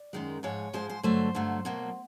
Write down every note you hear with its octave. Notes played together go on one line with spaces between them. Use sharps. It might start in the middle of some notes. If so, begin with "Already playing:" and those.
Already playing: D5
F#2 D#3 G#3
G#2 F3 G#3 C#5
G#2 F3 G#3 C5
C5
G2 D3 F#3 A3 C5
G2 D3 F#3 A3
B2 F#3 A#3